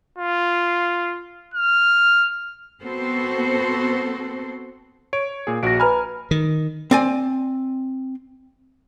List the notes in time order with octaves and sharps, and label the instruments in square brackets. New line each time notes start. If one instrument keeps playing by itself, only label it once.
[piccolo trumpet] F4
F6
[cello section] B3 C4 F#4 A4 C5
[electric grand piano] C#5 [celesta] D7
[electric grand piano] A#2 G#4
[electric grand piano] A#1 F#4 [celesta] A#6 D7
[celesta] B4 A#5 B5 [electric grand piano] G#5 F6
[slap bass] D#3
[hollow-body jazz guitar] C4 D5 G#5